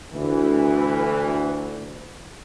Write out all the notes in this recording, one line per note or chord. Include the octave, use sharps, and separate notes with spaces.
D2 E3